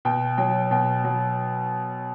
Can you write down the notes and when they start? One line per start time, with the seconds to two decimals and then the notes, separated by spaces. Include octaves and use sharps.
0.05 B2 G5
0.38 F#3 G5
0.71 B2 G5
1.04 F#3